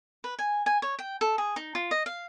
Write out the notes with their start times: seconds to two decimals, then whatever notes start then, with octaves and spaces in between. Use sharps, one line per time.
0.24 B4
0.39 G#5
0.66 G#5
0.82 C#5
0.99 G5
1.21 A4
1.38 G#4
1.56 D#4
1.75 F4
1.91 D#5
2.06 F5